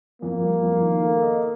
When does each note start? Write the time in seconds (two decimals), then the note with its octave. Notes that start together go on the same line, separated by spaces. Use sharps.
0.22 F2 A#3
0.43 G3
0.63 F2
0.82 D#3
1.03 A4
1.22 D#5